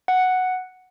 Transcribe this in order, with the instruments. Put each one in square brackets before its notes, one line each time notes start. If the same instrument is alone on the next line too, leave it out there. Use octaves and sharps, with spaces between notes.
[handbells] F#5